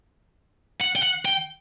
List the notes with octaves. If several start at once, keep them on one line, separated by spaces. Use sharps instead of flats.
F#5
G5
F#5
G5